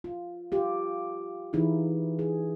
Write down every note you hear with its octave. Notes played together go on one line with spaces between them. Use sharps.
F4
F4 G4
E3 D#4 E4 G4 G#4
G#4